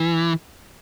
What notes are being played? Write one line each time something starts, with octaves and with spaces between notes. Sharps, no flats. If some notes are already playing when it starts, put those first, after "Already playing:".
Already playing: E3